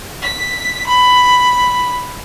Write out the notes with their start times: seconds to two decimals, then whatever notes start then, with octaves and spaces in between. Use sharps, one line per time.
0.22 B6
0.86 B5